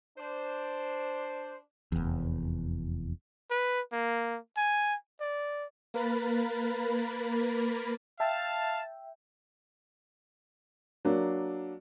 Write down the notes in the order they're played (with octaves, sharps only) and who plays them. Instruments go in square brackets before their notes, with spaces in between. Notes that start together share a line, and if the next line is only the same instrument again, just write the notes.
[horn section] D4 C5
[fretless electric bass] F1 E2
[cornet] B4
A#3
G#5
D5
[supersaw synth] A#3 A#4 B4 B5 A6
[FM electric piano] E5 G5 [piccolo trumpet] F5 [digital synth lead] A5
[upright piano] F#3 A#3 D4